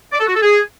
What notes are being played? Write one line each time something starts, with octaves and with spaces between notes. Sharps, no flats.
D5
A4
F#4
A4
G#4